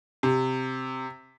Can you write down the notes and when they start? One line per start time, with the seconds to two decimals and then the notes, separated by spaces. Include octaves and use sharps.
0.23 C3